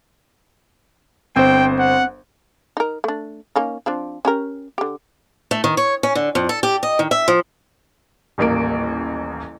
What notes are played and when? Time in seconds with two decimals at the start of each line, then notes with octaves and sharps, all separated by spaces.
1.36 G1 C4 C5 G5
1.79 F#5
2.77 D#4 A#4
3.04 A3 D4
3.56 A#3 C#4 D#4
3.86 F3 C4 D4
4.25 C#4 G4 A#4
4.78 D3 G4
5.51 A3
5.64 D#3
5.77 C#5
6.03 C#4
6.15 D3
6.35 F2
6.49 A4
6.63 G4
6.83 D#5
6.99 D#3
7.11 E5
7.28 F3
8.38 D#1 A1 A#3 D7